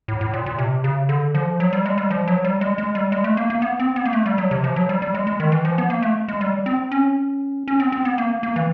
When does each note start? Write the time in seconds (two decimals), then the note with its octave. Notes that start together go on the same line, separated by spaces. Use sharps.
0.08 A2
0.21 A2
0.33 A#2
0.46 A#2
0.58 C3
0.84 C#3
1.09 D3
1.35 F3
1.60 F#3
1.73 G3
1.86 G#3
1.98 G3
2.11 F3
2.28 F#3
2.44 G3
2.61 G#3
2.78 G#3
2.95 G3
3.12 G#3
3.24 A3
3.37 A#3
3.50 A#3
3.62 B3
3.80 C4
3.96 B3
4.05 A#3
4.13 A3
4.26 G3
4.38 F#3
4.51 C3
4.64 F3
4.76 F#3
4.89 G3
5.02 G3
5.14 G#3
5.27 G#3
5.40 D#3
5.52 E3
5.65 F3
5.78 B3
5.90 A#3
6.02 A3
6.28 G#3
6.41 G3
6.66 C4
6.92 C#4
7.68 C#4
7.80 C4
7.92 C4
8.05 B3
8.18 A#3
8.43 A#3
8.56 E3